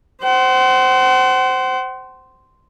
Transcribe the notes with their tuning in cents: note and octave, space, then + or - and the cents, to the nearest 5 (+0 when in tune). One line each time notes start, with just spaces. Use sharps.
C5 -5 F#5 +40